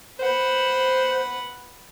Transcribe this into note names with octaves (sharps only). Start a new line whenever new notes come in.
B4 C5 F#5